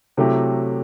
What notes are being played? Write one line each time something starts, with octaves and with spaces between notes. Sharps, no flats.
C3 F#3 A3 E4 G4